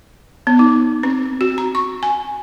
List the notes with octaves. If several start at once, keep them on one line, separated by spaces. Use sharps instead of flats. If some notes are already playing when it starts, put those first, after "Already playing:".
B3
D#4
C4
F#4
A#5
C#6
G#5